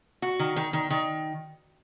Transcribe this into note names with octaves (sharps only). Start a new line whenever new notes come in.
F#4
D#3
D#3
D#3
D#3